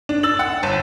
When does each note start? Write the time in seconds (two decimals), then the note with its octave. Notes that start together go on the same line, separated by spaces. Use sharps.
0.09 D4
0.23 E6 A6 F#7
0.39 F#5
0.63 G1 A5